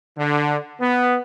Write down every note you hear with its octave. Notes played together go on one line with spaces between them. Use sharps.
D3
B3